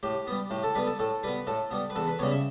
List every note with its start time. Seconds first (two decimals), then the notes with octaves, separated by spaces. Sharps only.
0.03 A2 G4
0.27 G3 B3
0.50 A2 G4
0.63 A4
0.75 G3 B3 B4
0.87 A4
0.99 A2 A4
1.23 G3 B3 B4
1.47 A2 A4
1.71 G3 B3
1.90 B4
1.96 E2 A4
2.07 B4
2.19 C#3 G3 B3 C#5
2.31 E5